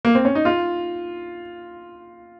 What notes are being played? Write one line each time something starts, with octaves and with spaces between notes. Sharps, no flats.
A#3
C4
C#4
D#4
F4